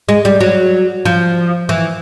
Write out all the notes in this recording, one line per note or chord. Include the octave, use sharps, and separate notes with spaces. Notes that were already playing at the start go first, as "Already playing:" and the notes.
G#3
G3
F#3
F3
E3